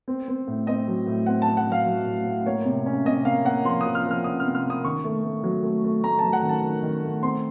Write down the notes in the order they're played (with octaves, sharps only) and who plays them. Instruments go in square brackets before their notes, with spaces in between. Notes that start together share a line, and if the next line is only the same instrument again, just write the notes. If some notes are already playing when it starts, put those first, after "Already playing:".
[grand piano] C4
C4
A2
C4 D#5
F#3
A2
C4 F#5
A5
C4
F#5
F#3 F5
F#3
A2
A2
A#3 C#5
C3
C#4
C3 D#5
A#3 F5
A#3 F#5
F3 C6
F3 D#6
F6
F3
F6
C#4 D#6
C3 F6
F6
A#3
D#6
D#3 C#6
A3
A3
F#3
A3
A3
A3 A#5
A5
F#3
F#5
D#3
A5
D#3
D#3
A3
C4 C6